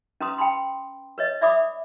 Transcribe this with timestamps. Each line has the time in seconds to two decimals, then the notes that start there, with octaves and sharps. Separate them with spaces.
0.20 C#4 B4 A#5 C6 D#6
0.38 G5 A5 B5 C6
1.18 B4 C#5 D#5
1.41 D5 E5 B5 D6 D#6